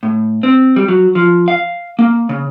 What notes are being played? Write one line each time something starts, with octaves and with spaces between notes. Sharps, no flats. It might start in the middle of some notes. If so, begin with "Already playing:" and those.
A2
C4
G3
F#3
F3
F5
A#3
C#3